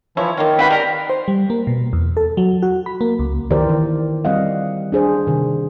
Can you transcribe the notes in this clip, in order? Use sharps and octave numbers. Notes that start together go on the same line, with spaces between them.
E3 F3 E4 C#5
D#3 A#3 F4
C4 C#4 F#4 B4 F5 G5 B5
G3 G#3 A#4
C5
G3
A#3
B2
E2
A4
F#3
F#4
B5
A#3
C#2
D#3 E3 G4 A#4 C5 D5
D#3
G3 C4 D#5 F5 F#5
D4 G#4 C5
C3 D#3